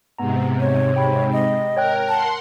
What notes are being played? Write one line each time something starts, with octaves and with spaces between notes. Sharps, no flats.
G#2 C3 B3 A#5
C#5
G5 B5
D#5
A#4 C#5 G5 F#6
F#5 A5 C6